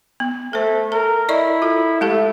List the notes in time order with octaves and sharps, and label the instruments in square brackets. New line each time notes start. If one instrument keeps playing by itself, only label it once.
[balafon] B3
[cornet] A3 [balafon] A4 C5
[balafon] A4 [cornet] A#4
[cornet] E4 [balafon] D5 D#5 C#6
[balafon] F4 A4
[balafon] G#3 G4 A4 [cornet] A3